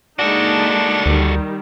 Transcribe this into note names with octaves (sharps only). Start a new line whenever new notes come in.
G#3 A#3 D4 D#4 F#4 A4
D2 D#3 G3